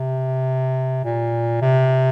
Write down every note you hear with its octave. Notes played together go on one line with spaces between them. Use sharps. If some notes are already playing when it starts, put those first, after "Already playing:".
Already playing: C3
A#2
C3